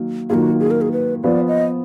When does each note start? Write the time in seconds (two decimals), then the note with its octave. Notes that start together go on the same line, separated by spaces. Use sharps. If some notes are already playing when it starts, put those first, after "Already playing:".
Already playing: D#3 F#3 A#3
0.30 D#3 F#3 A#3 F4 F#4 G#4
0.60 G#4
0.71 A#4
0.81 G#4
0.92 B4
1.24 F3 B3 F4 D5
1.48 D#5